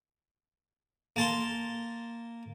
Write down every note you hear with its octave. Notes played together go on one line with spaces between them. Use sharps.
A#3 A5 C6